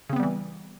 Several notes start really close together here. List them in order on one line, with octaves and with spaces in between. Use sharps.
C#3 C4 B3 G3 E3